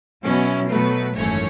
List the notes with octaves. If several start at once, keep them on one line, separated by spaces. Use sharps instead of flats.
B2 F#3 C#4 E4
B2 F#3 A3 B4
G#1 F#2 E3 A3 C#4 C#5